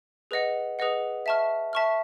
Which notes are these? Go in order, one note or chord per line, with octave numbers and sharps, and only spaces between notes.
G#4 B4 D#5 F#5
G#4 B4 D#5 F#5
E5 A5 C#6 F6
E5 A5 C#6 F6